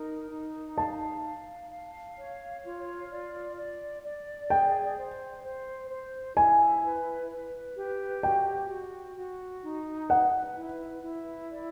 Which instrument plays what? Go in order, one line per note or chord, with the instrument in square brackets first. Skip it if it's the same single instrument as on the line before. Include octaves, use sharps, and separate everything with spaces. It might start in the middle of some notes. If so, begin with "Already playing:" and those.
Already playing: [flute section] D#4 A#4
D#4
[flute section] F5 [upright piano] A5
[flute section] F5
F5
C#5
F4
D5
D5
D5
[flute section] G#4 [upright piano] G5
[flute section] C5
C5
C5
[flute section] E4 [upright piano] G#5
[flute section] B4
B4
G4
[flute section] F#4 [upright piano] G5
[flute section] F#4
F#4
D#4
[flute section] B4 [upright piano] F#5
[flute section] E4
E4
D5